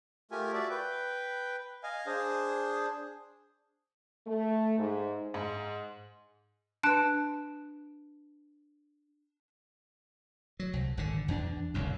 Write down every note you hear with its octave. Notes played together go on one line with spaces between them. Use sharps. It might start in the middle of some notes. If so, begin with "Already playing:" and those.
A3 F4 G4 A#4 G#5
F#4 D5 E5
B4 G5
D#5 F5 G#5
D4 G#4 C5
A3
G#2
G#2
D4 B4 A5 F#6 D7
F#3
C2
G#1 D3
E2 D4
F#1 C2 F2